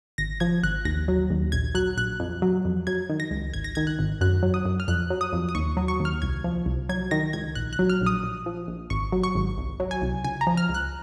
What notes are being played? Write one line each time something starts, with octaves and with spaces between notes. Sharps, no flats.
G#1 A#6
F3 G#6
G#1 F#6
D#2 A#6
F#3
D#2
A#1 G#6
F#3 F#6
A#1 F#6
F2
F#3
F2
F#3 G#6
D#3
A#6
C#2
G#1 G#6
A#6
D#3 G#6
F#6
G#1
F#2 F#6
F#3
D#6
F#2
F6
F2 F#6
F#3
D#6
F2
D#6
D#2 C#6
F#3
C#6
D#2
F6
C2 G#6
F3
C2
F#3 G#6
D#3 A#6
C#2 G#6
A#1 F#6
F#6
F#3
F6
A#1
D#6
A#1
F3
A#1
G#1 C#6
F#3
C#6
G#1
C2
F#3
G#5
C2
C#2 G#5
A#5
F3
F6
C#2
F#6